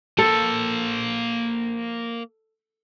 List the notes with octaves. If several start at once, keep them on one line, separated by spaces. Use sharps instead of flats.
A#3 A4 C5